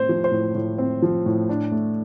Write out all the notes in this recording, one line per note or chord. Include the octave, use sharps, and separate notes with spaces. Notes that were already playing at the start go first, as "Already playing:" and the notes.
Already playing: A2 C4 C5
F3
C5
A2
A2
C4
F3
A2
D4
A3